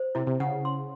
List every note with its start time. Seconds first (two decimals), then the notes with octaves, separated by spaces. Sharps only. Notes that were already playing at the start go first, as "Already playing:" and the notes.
Already playing: C5
0.15 C3 E4
0.27 C3
0.40 C#3 F#5
0.65 C6